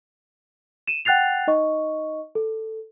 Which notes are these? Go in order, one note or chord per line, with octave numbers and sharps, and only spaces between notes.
D#7 E7
F#5 G5 F#6 A6 C7 F7
D#4 D#5 C#6
A4